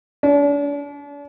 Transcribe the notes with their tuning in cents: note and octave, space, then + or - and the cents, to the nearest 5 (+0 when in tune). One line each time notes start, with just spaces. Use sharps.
D4 -40